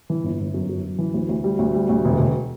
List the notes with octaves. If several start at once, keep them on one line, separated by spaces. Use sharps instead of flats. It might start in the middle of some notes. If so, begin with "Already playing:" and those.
E3
G1
G1
F#2
F#2
F#2
E3
D2
D2
G3
D2
G3
D2
E1
E1